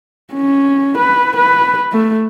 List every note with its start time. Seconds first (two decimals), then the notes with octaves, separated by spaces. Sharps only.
0.33 C#4
0.98 B4
1.37 B4
1.93 A3